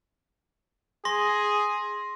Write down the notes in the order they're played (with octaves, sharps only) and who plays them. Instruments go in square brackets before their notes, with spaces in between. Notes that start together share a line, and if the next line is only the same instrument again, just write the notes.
[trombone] G#4 [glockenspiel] C6 A#6